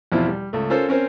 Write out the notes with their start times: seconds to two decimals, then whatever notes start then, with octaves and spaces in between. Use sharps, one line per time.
0.12 E2 B2 F3 C4 E4
0.29 G3
0.53 C#2 A3
0.70 C#4 F4 A4 A#4 C5
0.89 C4 C#4 A#4 C5